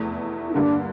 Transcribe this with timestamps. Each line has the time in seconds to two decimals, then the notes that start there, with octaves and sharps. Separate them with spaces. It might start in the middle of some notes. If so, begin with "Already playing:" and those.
Already playing: F1 E2 E3 A3 E4
0.49 E4
0.54 G2 D3 G3 A#3 D4